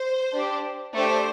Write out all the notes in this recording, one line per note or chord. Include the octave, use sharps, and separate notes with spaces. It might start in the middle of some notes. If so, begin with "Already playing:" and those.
Already playing: C5
D4 G4
A3 D4 G4 C5